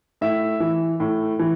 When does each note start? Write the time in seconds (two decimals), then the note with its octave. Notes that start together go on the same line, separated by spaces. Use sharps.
0.21 A2 E5
0.60 E3
1.00 A2
1.39 E3